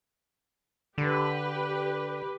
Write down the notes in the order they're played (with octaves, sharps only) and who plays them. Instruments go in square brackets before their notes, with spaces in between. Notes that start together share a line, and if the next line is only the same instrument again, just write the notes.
[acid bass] D3 [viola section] G4 B4